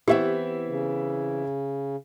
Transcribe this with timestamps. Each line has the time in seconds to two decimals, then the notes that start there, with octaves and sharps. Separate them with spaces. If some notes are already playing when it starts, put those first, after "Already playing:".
0.08 E3 B3 C4 E4 G4 E5
0.68 C#3